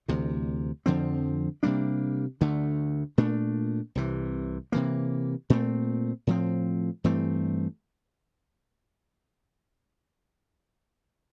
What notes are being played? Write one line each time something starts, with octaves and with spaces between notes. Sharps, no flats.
D2 C3 E3
F2 D3 F3 C4
C3 G3 A#3 D4
D2 D3 A3
A#2 A3 D4
C2 C3 E3
C3 E3 A#3
A#2 A3 C4
A2 F3 C4
G2 E3 A3 C4